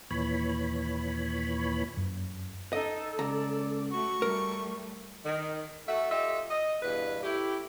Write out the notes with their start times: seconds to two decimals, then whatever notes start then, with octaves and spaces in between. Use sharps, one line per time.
0.11 D#2 A#2 E3 C#5 B5
1.97 F#2
2.73 D#4 A4 D#5
3.19 C#2 D5 A#5
3.91 A3 F#4 C#6
4.22 G3 A3 A#4
5.24 D#3
5.87 A3 F#4 A4 E5
6.09 F4 G4 A4 D#5 E5
6.49 D#5
6.82 E2 G2 B2 B4
7.23 A3 E4 G4